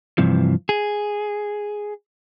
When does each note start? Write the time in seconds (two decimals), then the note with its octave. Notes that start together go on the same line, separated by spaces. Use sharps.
0.18 G2 C3 E3 F3
0.69 G#4